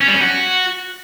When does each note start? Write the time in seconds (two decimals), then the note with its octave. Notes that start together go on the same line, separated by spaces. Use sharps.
0.01 C#4
0.07 G3
0.14 C#4
0.21 F#4